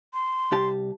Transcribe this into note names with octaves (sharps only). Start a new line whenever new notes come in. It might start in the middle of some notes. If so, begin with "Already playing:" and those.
C6
C2 G4 A5